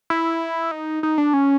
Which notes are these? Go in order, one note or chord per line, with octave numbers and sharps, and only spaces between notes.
E4
D#4
D#4
D4
C#4